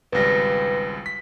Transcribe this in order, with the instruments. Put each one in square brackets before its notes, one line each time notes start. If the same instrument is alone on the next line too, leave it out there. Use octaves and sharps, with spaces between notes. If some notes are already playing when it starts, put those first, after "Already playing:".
[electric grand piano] G#1 C#2 G3 [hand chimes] B4 A#6
[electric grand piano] B6